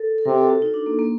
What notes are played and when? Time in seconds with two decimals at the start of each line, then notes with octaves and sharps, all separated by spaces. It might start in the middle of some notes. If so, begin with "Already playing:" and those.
Already playing: A4 A#4
0.18 A4
0.25 C3 A#4
0.38 A4
0.50 F#4
0.62 D#4
0.74 D4
0.86 A#3
0.99 A#3